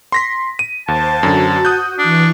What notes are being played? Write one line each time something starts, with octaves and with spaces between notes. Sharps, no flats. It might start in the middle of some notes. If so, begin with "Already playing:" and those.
C6 A#6 B6
D#7
D#2 C5 A5
F#2 D3 F#4
D#6 F#6 G6
E3 D4 C#6